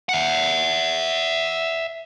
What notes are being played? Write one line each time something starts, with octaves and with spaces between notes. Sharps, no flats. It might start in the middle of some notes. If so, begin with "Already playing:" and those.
E5 F#5